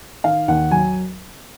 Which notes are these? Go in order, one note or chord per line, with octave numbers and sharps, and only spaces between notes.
D#3 F5
D#2 F#5
F#3 G#5